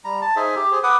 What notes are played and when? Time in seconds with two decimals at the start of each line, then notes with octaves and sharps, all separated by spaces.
0.05 G3 A#5
0.22 A5
0.36 D#4 G#4 C5 E5
0.56 G4
0.72 G#4 C5
0.83 B4 F#5 D6 D#6